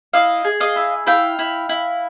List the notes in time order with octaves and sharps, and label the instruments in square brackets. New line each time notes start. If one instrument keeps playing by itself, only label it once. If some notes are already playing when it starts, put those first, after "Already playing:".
[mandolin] E4 D#5 F5
G#4
D#5 F5
E4
E4 F5 G5
E4
E4